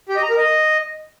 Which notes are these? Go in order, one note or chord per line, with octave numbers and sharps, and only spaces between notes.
G4
D#5
A#5
A#4
D#5